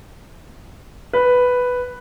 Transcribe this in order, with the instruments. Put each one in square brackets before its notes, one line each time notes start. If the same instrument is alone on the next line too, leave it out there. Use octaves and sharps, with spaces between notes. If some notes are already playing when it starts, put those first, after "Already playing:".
[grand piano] B4